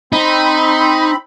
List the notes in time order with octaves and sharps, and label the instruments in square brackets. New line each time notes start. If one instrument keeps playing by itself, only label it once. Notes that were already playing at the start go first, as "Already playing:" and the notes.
[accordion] C4 B5 [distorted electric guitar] D#4